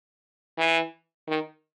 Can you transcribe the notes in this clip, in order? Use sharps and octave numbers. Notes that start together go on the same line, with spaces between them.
E3
D#3